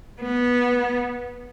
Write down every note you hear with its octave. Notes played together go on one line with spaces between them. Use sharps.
B3